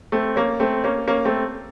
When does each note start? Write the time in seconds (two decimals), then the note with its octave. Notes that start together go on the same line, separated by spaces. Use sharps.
0.12 A3 C4
0.36 A#3 C#4
0.60 A3 C4
0.84 A#3 C#4
1.08 A#3 C#4
1.25 A3 C4